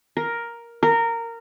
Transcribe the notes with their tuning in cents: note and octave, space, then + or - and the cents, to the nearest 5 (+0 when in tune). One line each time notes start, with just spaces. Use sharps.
A#4 +5
A#4 -15